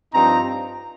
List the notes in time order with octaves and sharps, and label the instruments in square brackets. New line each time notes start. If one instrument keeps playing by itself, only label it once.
[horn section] G2 F3 C4 D#4 A#5